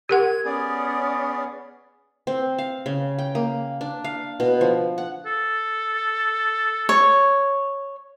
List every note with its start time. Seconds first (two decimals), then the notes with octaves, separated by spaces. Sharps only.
0.09 G4 A#4 F#5 G#6
0.45 B3 C#4 G#4 D5
2.27 C4
2.58 F5
2.86 C#3
3.19 G5
3.35 A#3
3.81 D4
4.04 F5
4.40 B2
4.61 F3
4.98 F#5
5.26 A4
6.89 C#5